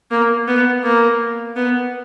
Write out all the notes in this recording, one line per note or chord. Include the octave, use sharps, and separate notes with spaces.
A#3
B3
A#3
B3